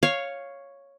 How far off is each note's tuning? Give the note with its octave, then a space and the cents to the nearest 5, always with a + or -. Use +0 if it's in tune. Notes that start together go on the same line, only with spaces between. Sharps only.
C#5 +0 F5 +0